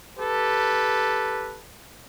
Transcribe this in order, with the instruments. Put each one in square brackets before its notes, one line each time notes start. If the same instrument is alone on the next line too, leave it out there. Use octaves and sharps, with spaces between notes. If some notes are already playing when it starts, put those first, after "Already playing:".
[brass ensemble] G4 A4 B4